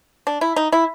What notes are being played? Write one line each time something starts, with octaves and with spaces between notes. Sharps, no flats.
D4
E4
D#4
E4